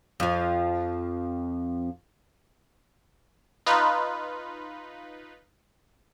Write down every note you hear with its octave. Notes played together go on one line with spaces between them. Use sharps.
F2 F3
D#4 F4 B4